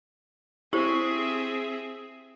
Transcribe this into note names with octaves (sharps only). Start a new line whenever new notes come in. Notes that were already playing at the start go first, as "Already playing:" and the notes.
C4 E4 G4 G#4 C5 E5